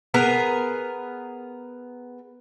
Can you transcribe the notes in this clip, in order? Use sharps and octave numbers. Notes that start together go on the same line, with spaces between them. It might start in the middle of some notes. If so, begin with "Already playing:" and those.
B3 G#4 A#4